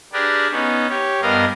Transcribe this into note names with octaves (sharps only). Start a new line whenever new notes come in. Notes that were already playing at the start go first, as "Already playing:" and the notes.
D4 G4 G#4 A#4 B4 D5
B3 C#4 D#4
G4 C#5
G2 B3 A#4 D#5 F5